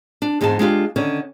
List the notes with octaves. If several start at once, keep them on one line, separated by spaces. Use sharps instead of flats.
D4
E2 G#2 G#3 C4 A5
G#3 D4 F4 G4
D3 D#3 C#4